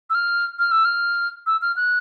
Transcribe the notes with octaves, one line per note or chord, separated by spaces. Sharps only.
E6
F6
F6
E6
F6
E6
F6
F#6